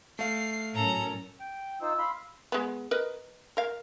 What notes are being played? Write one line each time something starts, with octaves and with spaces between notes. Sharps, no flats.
A3 F5 C7
A2 F#3 C#4 A4 A#4 A#5
G5
D#4 F4 C5 E6
F5 B5 C6
G#3 B3
A#4 B4 D#5
A#4 F5